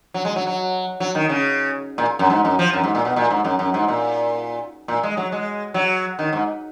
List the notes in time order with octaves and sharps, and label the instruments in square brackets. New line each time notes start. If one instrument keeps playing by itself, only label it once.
[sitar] F#3
G#3
F#3
F#3
F#3
D#3
C#3
A#2
F#2
G#2
F#2
F3
F#2
G#2
A#2
B2
A#2
G#2
F#2
F#2
G#2
A#2
A#2
G#3
F#3
G#3
F#3
D#3
G#2